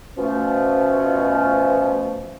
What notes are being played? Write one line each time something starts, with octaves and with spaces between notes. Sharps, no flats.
B2 F3 A3 C#4